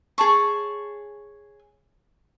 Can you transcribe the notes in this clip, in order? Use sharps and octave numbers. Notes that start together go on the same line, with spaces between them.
G#4 C#5 A5 C#6